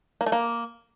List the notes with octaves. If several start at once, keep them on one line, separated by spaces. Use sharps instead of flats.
A#3
A3
A#3